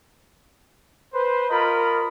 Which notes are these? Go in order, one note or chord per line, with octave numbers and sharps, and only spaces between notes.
B4 C5
F4 A#4 D#5 A#5 B5